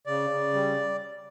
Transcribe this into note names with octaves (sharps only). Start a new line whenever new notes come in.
C#3 D5
C#3
G3